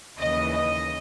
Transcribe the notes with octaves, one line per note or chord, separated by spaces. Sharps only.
D#2 C#3 E3 D#5
D#5